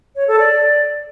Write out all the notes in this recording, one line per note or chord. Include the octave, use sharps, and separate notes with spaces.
C#5
A4
D5